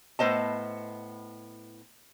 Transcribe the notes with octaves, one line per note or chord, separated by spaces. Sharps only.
A2 B3 C5 D#5 A5